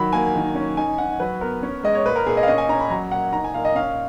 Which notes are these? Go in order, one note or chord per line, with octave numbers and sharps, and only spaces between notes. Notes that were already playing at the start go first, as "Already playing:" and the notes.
Already playing: D#3 F#3 B5
A#3 G#5
D#3
C#4
D#4 G#5
D#4 F#5
F#3 B4
B3 A#4
C#4
G#3 D#5
C#5
A#2 B4
A#4
A#2 G#4
D#5
F5
C#4 D#5
G#5
C#4 A#5
B5
F#3 A#5
A#2 F#5
D#4 A#5
G#5
A#2 F5
D#5
C#4 F5